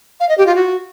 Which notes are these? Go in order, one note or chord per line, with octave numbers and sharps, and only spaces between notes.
F5
D#5
G4
F4
F#4